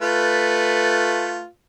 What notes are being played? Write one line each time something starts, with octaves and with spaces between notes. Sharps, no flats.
A3 F4 B4